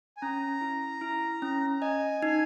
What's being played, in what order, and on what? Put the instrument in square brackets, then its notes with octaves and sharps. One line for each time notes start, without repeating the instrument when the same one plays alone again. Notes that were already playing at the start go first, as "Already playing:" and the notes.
[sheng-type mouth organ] G#5
[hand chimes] C#4 [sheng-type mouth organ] A#5
[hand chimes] E4
E4
C#4
[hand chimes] D#5 [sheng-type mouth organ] G#5
[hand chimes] D#4